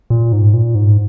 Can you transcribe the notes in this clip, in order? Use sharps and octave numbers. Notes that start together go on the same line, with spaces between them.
A#2
G#2
A#2
G#2